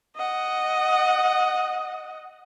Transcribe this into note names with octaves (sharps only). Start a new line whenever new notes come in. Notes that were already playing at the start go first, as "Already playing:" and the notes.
D#5 F#5